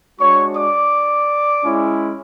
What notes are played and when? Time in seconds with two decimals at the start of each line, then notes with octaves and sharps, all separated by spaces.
0.19 G#3 D4 F#4 C#5 C#6
0.55 D5 D6
1.65 G#3 C#4 E4